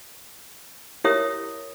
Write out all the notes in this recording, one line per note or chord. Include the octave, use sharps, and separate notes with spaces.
E4 G4 A#4 C#5 E5 D#6